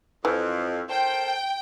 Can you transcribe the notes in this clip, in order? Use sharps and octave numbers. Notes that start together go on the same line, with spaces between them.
F2 E3
A4 A#4 C5 G5